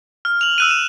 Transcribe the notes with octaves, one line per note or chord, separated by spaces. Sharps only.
F6
F7 F#7
E6 F#6 D#7
E7